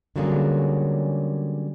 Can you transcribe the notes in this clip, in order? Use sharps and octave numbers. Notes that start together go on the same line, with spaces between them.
D3 F#3 G3 A#3 C#4 G#4